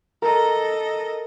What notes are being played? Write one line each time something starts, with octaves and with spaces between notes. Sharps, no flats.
A4 A#4 D#5